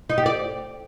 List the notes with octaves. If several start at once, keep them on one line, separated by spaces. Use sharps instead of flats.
D#4
G4
D5